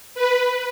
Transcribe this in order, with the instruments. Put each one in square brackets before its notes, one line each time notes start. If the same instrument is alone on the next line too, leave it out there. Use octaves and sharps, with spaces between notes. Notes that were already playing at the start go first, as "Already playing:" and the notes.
[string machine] B4